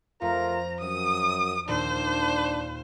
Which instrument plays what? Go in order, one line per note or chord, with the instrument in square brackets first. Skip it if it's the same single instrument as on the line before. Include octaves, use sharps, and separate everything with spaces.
[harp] F2 [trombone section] A3 F4 A#4 [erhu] A#5
[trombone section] F#2 [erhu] D#6
[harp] D#2 A#2 [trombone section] D4 [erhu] C5